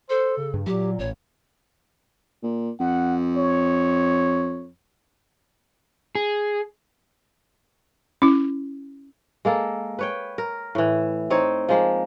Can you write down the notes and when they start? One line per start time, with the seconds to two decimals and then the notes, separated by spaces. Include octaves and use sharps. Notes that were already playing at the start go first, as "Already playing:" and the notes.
0.10 A4 C5
0.37 C#3
0.54 G2
0.66 A#2 F#3 G4
0.99 A1 C#5
2.43 A#2
2.80 F2 F#5
3.37 C#5
6.15 G#4
8.22 C#4 E4
9.45 G#3 A#3 A4
9.99 B4 C#5 G5
10.38 A#4
10.75 A2 E3
11.30 C4 D#4 C#5
11.69 F3 G#3 A#3